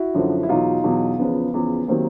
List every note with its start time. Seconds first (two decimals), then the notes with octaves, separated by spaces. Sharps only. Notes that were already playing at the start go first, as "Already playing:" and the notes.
Already playing: E4 F#4
0.14 F#2 D3 F3
0.43 E4
0.49 E2 B2 F#3 D#4 F4
0.84 E2 B2 F#3
1.18 E2 C#3 F3 B3
1.54 E2 C#3 F3
1.88 C3 D#3 F#3 A#3 C4